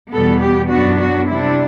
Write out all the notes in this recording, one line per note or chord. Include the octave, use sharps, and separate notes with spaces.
E2 B2 G3 B3 A4
G4
F#2 F#3 B3 D4 F#4
F#4
C3 G3 D4 E4